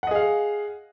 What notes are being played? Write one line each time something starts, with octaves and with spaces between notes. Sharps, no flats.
G#4 D#5 F5 F#5